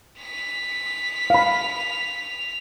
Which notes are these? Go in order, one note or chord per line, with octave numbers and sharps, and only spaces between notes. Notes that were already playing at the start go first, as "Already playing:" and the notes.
B6 F7
F5 B5